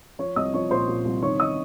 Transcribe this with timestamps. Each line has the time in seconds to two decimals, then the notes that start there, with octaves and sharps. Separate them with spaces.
0.19 F3 C#5 C#6
0.36 C2 D#5 D#6
0.54 F3 C#5 C#6
0.71 A#2 C5 C6
0.88 A#2
1.05 C2
1.22 D#3 C#5 C#6
1.40 D#3 D#5 D#6